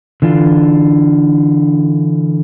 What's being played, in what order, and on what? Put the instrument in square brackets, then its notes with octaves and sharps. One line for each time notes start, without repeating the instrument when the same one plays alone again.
[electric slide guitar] D3 E3 D4 F4